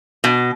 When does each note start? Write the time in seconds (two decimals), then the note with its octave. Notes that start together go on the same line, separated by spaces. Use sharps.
0.24 B2